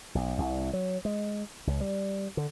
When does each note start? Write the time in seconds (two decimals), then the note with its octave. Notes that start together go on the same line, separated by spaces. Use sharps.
0.15 B1
0.38 C2
0.73 F#3
1.05 G#3
1.67 C#2
1.81 G3
2.37 D3